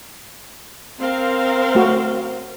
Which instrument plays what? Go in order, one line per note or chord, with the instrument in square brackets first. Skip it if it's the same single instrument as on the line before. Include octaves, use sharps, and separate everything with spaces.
[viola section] C4 A#4 F5
[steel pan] A3 F#4